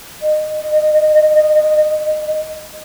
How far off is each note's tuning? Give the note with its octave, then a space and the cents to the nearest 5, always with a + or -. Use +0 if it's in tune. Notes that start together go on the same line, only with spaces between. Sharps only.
D#5 -20